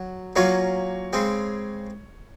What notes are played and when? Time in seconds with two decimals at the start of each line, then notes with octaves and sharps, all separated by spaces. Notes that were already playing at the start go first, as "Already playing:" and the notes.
Already playing: F#3
0.36 F#3 A#3 C#4 F4 C#5
1.13 C#3 G#3 C4